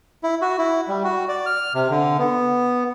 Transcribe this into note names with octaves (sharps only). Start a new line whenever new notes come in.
E4
F#4
E4
G3
F#4
D5
F6
C3
D3
B3